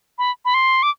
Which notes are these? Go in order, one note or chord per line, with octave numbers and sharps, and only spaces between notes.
B5
B5
C6
D6